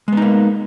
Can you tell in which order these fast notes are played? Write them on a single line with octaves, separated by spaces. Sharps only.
G#3 B3 D#4 A#3